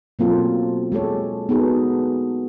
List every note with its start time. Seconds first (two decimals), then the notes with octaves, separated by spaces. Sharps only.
0.19 B2 F#3 A#3 C4 F4 A4
0.92 G#3 G4 A4 C#5
1.49 B3 D#4 F#4 G#4 A4